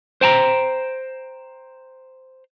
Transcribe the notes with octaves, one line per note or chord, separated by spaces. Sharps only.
C5 G5 A5 A#5